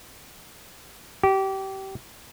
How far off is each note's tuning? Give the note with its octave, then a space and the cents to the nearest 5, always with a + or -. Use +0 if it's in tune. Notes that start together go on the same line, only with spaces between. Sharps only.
G4 -25